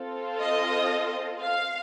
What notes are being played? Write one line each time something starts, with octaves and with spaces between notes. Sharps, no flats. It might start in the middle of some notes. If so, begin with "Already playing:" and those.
Already playing: C4 F4 A4
D#5
F5